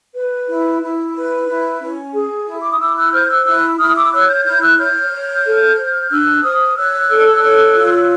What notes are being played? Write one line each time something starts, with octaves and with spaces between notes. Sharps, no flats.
B4
E4
E4
B4
E4
C#4
G#4
E4
D6
D#6
E4 D6 E6
E6 F#6
C5 F6 G6
E6 F#6
E4 E6 F#6
E4 D#6 F6
D6 E6
C#5 E6 F#6
F6 G6
E4 F6 G6
E6 F#6
C#5 F6 G6
C#5
A4
C5
D4 E6 F#6
C5 D#6 F6
C#5 E6 F#6
A4
C#5
F4